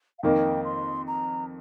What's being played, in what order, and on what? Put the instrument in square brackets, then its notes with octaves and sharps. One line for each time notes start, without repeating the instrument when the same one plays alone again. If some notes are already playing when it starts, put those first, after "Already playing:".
[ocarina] F5
[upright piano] F2 D#3 A#3 D#4 [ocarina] G5
[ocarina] C6
A#5